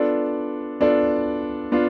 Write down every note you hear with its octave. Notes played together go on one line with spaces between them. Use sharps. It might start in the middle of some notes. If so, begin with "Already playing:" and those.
Already playing: B3 D4 F4 A4 D5
B3 D4 F4 A4 D5
B3 D4 F4